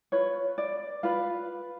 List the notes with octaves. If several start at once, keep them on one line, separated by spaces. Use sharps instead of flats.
F4 B4 C#5
D5
F4 B4 F5